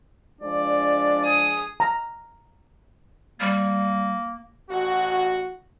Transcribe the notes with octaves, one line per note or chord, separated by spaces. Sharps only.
F3 G#3 D4 D5
G#4 D#6
A#5
G3 A#3
A1 F#4